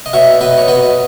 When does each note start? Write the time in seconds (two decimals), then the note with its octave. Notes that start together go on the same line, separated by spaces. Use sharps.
0.06 D#5
0.13 B2 C#5 E5
0.41 B2 B4 D#5
0.58 C#5
0.68 B2 B4 D#5